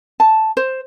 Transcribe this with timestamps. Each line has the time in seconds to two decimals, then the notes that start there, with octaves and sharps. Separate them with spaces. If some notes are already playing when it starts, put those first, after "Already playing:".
0.20 A5
0.57 C5